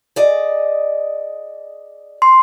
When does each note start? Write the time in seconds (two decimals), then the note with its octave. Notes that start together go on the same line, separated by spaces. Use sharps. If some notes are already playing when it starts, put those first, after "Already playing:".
0.16 G#4 D5 D#5
2.22 C6